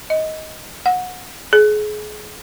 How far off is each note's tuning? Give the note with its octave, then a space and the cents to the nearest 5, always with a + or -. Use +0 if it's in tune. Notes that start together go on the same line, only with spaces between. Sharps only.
D#5 +15
F#5 -25
G#4 +30